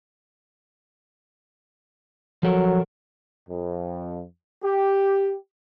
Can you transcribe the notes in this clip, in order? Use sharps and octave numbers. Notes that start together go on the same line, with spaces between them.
F3 F#3 A4 A#4
F2
G4